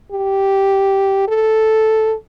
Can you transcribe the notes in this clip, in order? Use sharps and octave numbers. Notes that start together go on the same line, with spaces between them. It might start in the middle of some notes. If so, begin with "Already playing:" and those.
G4
A4